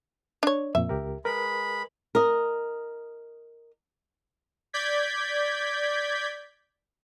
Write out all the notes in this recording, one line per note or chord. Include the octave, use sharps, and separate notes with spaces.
D4 C#5
F2 A#2 E5
C#2 G4 A#4
G#3 A#4 B4 B5
A#4 D#5
D5 G6 G#6 B6